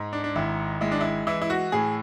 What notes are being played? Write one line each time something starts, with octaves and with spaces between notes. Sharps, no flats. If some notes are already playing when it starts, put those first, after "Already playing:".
Already playing: G#2 G#3
D4
D4
G#1 E4
G#3 E4
D4
E4
E3 E4
E4
F#4
A2 G#4